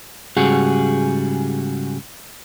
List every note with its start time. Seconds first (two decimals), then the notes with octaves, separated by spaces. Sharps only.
0.37 G#2 C#3 G3 F#4 G#4